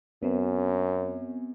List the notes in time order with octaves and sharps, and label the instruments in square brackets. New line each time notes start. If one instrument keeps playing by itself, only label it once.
[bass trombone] F#2 [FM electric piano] B3 C4